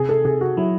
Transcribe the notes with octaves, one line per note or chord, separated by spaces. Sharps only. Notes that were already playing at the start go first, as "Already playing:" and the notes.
Already playing: C3 G#4
A4
C3 G#4
F#4
F#3 E4